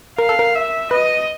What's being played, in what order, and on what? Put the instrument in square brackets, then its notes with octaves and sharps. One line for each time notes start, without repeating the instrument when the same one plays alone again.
[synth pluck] A#4 [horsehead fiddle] F5
[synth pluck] A4
A#4
[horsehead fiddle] E5
[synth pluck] B4 [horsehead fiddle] D#5